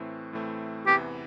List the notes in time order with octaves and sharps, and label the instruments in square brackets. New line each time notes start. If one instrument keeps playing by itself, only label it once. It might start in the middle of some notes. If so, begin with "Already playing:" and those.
Already playing: [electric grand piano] A2 E3 A3 C4
A2 E3 A3 C4
[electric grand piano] E2 C3 E3 B3 [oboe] G4